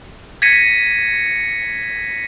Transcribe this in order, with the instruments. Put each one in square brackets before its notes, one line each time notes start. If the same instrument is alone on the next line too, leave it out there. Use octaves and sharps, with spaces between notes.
[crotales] G#6 A#6 B6 C#7 D#7